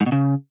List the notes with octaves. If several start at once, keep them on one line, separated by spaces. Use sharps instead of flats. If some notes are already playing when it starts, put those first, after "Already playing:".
G#2
B2
C#3